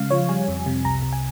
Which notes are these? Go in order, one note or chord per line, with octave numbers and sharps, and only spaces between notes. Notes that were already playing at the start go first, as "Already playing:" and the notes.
Already playing: C#3 G#3 F5
F3 C#5
G3 G#5
F2
C3
C2 A#5
C3
G#5